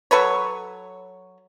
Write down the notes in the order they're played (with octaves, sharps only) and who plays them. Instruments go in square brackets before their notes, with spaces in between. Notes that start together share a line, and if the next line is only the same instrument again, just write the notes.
[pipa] F#3 A4 B4 C#5